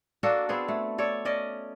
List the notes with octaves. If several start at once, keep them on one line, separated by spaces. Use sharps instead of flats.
A#3 D4 F#4 A4
B3 C4 G#4 A4
A3
A4 C#5 D5
C#4 D5 D#5